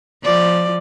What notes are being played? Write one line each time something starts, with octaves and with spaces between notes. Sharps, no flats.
F3 D5